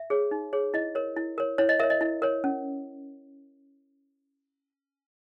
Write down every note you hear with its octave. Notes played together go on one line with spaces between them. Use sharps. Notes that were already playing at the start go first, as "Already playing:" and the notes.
Already playing: E5
G#4 C#5
D#4
G#4 C#5
E4 D#5
A#4 C#5
E4
A#4 C#5
E4 C#5
D#5
A#4 C#5 E5
D#5
E4
A#4 C#5
C#4